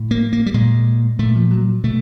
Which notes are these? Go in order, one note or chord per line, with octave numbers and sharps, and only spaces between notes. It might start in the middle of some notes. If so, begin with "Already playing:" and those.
Already playing: A2
A#3
A#3
G3
A#2 G#3
A#2 A3
F3
F#3
B2 A3